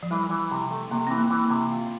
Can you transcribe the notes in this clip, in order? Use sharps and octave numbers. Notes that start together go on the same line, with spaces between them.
F3
E3 G3
E3
C3
A3
C3 A#3
E3 C4
A#3
E3
A#3
C3
F4